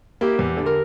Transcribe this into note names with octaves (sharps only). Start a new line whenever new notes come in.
A#3 E4 G4
E2
D3
A#4